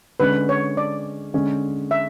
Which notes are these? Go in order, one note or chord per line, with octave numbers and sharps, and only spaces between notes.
D3 G#3 C#4 B4
C#5
D5
D3 G#3 C#4
E5